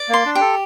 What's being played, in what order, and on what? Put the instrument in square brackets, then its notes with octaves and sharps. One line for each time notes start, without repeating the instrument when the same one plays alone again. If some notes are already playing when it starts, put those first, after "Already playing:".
Already playing: [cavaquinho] D5
[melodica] A#3 [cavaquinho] C6
[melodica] D4
[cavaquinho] G4
[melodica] A4